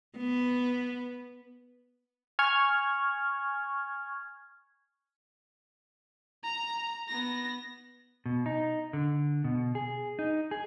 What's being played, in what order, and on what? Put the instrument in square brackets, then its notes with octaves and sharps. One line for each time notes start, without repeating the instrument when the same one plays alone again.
[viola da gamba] B3
[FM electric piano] G#5 C#6 F6 G#6
[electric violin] A#5
B3 A#6
[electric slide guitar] B2
D#4
D3
B2
G#4
D#4
G#4